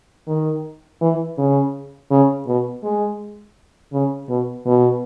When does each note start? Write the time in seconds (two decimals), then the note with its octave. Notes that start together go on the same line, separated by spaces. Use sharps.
0.28 D#3
1.01 E3
1.38 C#3
2.11 C#3
2.47 B2
2.83 G#3
3.93 C#3
4.29 B2
4.66 B2